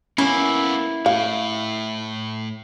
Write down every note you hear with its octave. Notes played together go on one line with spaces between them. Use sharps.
A#3 B3 C#4 E4
A2 F5